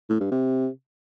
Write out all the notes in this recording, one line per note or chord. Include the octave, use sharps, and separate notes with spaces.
A2
G2
C3